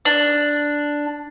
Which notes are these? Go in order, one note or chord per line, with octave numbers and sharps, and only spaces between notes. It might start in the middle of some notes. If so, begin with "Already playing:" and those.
D4